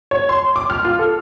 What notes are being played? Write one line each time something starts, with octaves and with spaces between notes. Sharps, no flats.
C#5
C6
D6
F6
F4
A4